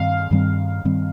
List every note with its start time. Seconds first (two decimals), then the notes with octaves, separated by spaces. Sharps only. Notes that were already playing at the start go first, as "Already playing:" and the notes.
Already playing: G2 D#3 G3 C4 F5
0.31 G2 D#3 G3 C4
0.85 G2 D#3 G3 C4